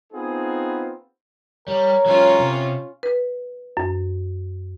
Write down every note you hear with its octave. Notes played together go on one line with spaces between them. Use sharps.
B3 C4 D#4 F4 G#4
G3 A#4 C#5
F#3 G#3 C#4 F4
C3
B4
F#2